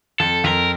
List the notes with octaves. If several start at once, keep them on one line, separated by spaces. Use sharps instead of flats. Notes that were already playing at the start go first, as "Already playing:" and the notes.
F2 A4
F2 A#4